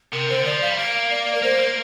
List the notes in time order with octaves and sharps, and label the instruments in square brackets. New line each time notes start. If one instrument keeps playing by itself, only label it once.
[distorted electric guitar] C3 [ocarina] A#4
[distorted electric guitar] D3 [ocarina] C5
[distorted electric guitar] F3 [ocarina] D5
[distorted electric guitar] G3 [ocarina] F5
[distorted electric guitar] A#3 [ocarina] F5
[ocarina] D5
A#4
[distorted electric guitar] A#3 [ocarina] C5
[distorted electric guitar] A#3